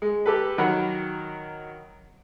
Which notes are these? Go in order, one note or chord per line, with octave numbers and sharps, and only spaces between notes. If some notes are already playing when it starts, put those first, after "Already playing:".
G#3
G4 A4 B4
D#3 F#3 A#4 F#5 B5